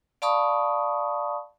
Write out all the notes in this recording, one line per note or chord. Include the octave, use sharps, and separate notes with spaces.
D5 F5 A5 B5 C#6 D#6